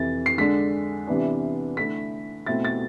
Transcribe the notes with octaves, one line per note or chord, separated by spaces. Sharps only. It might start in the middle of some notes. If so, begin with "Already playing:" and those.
Already playing: F2 C3 E3 A6
C7
D3 G#3 D4 B6
C3 E3 B3 D4
D3 A3 E4 B6
B2 A3 C4 E4 A6
A6